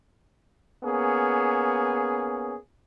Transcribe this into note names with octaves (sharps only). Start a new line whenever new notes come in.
A#3 B3 C#4 G#4